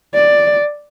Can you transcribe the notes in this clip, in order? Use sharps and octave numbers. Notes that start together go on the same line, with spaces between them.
D5